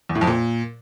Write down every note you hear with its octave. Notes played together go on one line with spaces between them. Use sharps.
E2
A2
F2
A#2